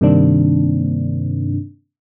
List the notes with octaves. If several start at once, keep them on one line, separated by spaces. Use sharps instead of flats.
G2 C3 D#3 A#3 C4 D4